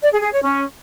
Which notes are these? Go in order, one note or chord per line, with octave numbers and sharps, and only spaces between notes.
D5
G#4
G#4
C#5
C#4